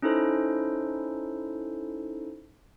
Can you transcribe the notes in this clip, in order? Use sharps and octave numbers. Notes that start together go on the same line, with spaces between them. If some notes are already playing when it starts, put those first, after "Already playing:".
C#4 D#4 E4 A4 C5